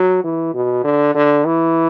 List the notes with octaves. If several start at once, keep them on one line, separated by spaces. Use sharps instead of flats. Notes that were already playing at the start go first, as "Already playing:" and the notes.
Already playing: F#3
E3
B2
D3
D3
E3